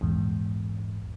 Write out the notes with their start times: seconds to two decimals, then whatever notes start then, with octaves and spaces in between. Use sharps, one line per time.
0.01 A#1 E2 G#2